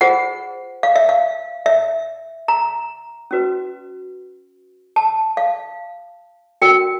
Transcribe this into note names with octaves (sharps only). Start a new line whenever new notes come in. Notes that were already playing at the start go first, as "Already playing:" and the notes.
F4 G#4 C5 F#5
F5
E5
F5
E5
A#5
C#4 F#4 B4
A5
F5
C#4 F#4 A#4 G5